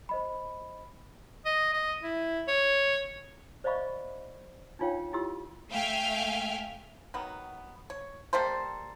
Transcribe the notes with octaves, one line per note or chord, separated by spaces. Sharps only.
C5 D#5 B5
D#5
D#5
E4
C#5
C5 D5 D#5 F5 B5 C#6
D4 D#4 F4 C#5 F5 G5
E4 F4 G4 C6 E6
A3 E5 F5 G5 G#5 F6
D#3 F#3 B3
C#5
G3 A#3 A4 C5